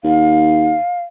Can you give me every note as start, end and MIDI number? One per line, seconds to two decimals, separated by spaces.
0.04 0.76 39
0.04 1.02 77